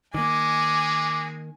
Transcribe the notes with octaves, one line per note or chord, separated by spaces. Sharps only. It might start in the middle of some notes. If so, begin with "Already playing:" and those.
D#3 G#3 A#3 G#5 D6